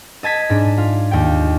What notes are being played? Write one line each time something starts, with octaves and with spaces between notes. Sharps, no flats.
D#5 A5 G#6 B6
G#2 D4
F4
D#2 G5